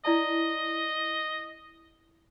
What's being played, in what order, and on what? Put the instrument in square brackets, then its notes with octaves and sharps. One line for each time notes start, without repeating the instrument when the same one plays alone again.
[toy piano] E4 D5 A5 [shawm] D#5